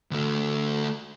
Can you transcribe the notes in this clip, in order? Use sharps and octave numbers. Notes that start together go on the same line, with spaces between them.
D2 A3